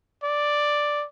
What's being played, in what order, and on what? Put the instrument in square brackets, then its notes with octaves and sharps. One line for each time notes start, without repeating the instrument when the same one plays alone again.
[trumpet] D5